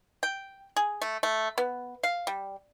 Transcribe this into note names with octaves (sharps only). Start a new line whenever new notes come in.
G5
G#4
A3
A3
B3
F5
G3